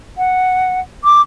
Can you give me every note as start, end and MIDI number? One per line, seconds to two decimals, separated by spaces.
0.18 0.80 78
1.04 1.22 86